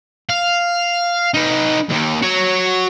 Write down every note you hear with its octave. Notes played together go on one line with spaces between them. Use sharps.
F5
D#4 B4
D#2 D#3
F#4 C#5